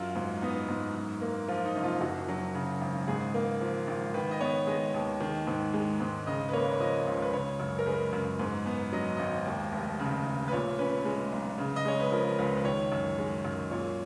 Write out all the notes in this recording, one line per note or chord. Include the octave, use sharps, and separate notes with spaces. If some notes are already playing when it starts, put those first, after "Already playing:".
Already playing: F#2 F#3 F4
G#2
B3 D#4
G#2
F#2
A#3
F3 F4
D#4
F#1
F4
F#2 F#4
F#3
C#3
G#1
G#2 G#4
A#3
F3
G#1
D#3 B4
D#5
B3 C#5
G#3 D#5
D#2
D#3
G#2
G#3
G#2
C#3 D#5
B4
A#3 C#5
C#5
F3 D#5
C#2
B4
C#3 C#5
F#2
A#4
G#3 B4
F#2
G#2
B3
F#3 D#5
G#1 D#5
D#2
F1
C#3
F1
B4
A#2 C#5
C#4 B4
G#3
B1
C#3
D#5
G#3 C#5
B4
F3 A#4
C#2 B4
B4
D#3 C#5
F#2
G#3
F#2
A#2 C#5